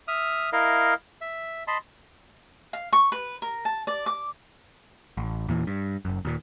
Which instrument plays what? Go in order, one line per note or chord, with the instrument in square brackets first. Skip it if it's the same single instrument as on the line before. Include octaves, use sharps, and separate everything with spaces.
[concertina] E5 D#6 F6
E4 A#4 D#5 F5
E5
D#5 A5 B5 C6
[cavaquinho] F5
C#6
B4
A#4
A5
D5
D6
[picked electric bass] A1
E2 A#2 E3
G2
F#1 F#2
D#2 A#2